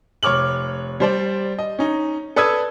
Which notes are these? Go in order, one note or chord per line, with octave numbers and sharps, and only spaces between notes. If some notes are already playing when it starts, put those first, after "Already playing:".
F1 C#5 D6 F6 F#7
G3 C5 D5
D#5
C#4 D#4
A4 B4 D5 D#6 E6 G#6